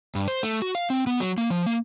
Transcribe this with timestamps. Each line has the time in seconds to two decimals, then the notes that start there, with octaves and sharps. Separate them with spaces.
0.15 G2
0.28 C5
0.43 A3
0.62 F#4
0.75 F5
0.90 C4
1.07 B3
1.20 F#3
1.38 A#3
1.50 F3
1.66 A#3